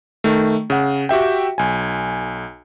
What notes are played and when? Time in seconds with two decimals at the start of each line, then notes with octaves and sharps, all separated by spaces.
0.24 D#3 A3
0.70 C#3 F#5
1.09 F#4 G4 E5 G5
1.58 B1 G#5